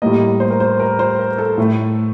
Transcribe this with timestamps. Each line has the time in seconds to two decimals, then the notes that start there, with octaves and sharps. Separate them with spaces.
0.02 A2 G3 A#3 D#5
0.40 C5
0.50 A#4
0.60 C5
0.80 A#4
0.99 C5
1.19 A#4
1.38 A4
1.58 A2 A3